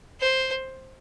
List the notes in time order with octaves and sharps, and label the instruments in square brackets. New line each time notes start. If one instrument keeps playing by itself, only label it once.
[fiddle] C5